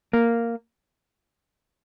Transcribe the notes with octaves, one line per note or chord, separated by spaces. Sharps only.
A#3